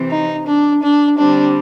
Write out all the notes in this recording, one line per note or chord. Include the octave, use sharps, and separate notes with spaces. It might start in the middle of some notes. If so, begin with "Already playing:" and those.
Already playing: C3 E3 C4
D#4
D4
D4
D3 G3 C4 D4